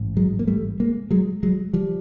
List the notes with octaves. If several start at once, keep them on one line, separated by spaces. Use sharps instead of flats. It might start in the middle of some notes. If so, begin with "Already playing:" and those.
Already playing: A1 G#2
F#3 G#3
A#3
G3 A3
G#3 A#3
F#3 G#3
F#3 G#3
F3 G3